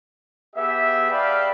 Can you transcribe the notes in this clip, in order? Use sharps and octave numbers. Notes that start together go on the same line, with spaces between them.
B3 G4 G#4 E5
B4 D5 F5 G5 A5 B5